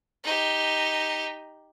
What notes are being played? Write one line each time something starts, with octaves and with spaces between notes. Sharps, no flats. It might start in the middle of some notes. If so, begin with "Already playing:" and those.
D#4 G4